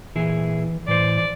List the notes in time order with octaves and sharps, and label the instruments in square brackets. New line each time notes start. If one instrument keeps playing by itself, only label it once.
[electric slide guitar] A#2 E4 G#4 [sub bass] E3
[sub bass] A2 [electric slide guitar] E3 C5 [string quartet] D5